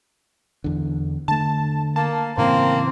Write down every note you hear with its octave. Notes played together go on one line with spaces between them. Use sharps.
E2 D3
D3 A3 A5
A#3 A5
A2 C#3 E3 A#3 C4